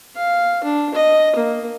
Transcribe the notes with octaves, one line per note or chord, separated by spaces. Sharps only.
F5
D4
D#5
A#3